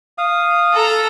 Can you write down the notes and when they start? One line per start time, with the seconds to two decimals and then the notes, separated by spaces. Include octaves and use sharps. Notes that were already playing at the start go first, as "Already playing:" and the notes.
0.18 F5 D#6
0.73 A4 A#5